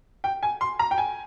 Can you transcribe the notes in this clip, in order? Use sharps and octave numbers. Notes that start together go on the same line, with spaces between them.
G5
G#5
C6
A#5
G5
G#5